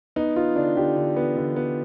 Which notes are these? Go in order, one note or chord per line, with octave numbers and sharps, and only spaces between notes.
B3 D#4
B3 F4
D3 D4
D3 G4
D3
B3
D3
B3